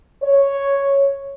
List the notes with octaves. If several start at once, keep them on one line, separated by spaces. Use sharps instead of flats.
C#5